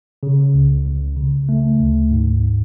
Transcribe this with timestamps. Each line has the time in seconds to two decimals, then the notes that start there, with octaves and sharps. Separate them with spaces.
0.23 C#3
0.54 C#2
0.86 C#2
1.17 C#3
1.49 A3
1.79 D2
2.11 G#2